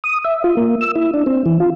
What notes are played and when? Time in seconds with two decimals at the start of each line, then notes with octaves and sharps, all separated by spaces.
0.04 D#6
0.24 E5
0.44 F4
0.57 A#3
0.81 E6
0.96 E4
1.14 D4
1.26 C4
1.46 E3
1.60 F4